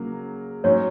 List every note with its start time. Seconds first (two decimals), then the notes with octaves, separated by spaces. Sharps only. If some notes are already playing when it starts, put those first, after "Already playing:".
Already playing: C#3 F#3 A#3
0.64 G#2 F#3 C#4 C#5